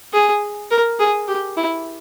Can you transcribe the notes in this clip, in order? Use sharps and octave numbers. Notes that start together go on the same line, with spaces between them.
G#4
A#4
G#4
G4
E4